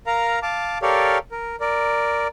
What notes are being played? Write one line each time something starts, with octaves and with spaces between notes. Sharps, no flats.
A#4 F5 A#5
F5 A5 D6
G4 A4 A#4 C#5 D5 F5
A#4
A#4 D5